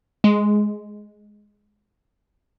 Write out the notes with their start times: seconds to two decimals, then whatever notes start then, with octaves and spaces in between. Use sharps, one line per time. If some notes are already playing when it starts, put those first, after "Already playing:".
0.24 G#3